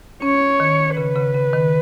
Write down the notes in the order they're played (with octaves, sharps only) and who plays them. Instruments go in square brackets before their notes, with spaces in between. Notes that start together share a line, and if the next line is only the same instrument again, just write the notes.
[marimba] C#4 [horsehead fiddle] C#5
[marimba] D#3
[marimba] C#3 [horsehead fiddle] B4
[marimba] C#3
C#3
D#3